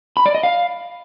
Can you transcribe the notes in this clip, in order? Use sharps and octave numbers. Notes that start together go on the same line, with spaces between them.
B5
D5
D#5
F5